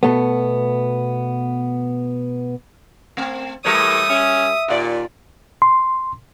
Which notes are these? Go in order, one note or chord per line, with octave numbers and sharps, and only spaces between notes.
B2 A3 B3
A3 C4
E3 G3 A3 A#4 C#5 D#6
C#4 E5
D#2 A#2 F4 D5
C6